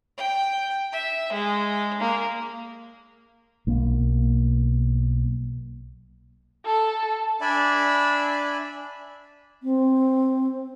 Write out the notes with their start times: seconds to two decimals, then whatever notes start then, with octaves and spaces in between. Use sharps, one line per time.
0.17 G5
0.92 E5
1.32 G#3
2.00 A#3
3.67 B1 A#3
6.65 A4
7.41 D4 D5 E5 G#5 B5
9.63 C4